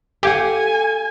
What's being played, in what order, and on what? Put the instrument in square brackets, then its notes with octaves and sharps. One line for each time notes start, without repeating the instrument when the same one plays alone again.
[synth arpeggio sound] G4 [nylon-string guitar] A4 F5 F#5 [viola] G#5